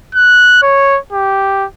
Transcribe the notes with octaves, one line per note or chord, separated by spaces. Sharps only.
F#6
C#5
G4